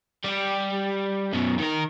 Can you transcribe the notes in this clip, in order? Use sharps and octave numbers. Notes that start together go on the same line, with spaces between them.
G3 G4
F#2 B2
D#3 A#4